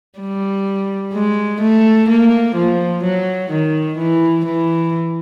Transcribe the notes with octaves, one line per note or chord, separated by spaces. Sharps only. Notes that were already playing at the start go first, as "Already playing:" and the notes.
G3
G#3
A3
A#3
F3
F#3
D#3
E3
E3